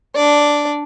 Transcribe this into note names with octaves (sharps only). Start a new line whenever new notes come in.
D4 D5